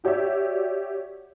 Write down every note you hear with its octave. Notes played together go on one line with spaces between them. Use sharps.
F#4 G4 C#5 D5 E5